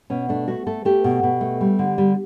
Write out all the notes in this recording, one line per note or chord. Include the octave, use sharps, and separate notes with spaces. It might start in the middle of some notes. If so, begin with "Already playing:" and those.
B2 C#4
A3 D4
A3 F#4
A3 A4
A3 G4
B2
B2
A3
G3
D3
G3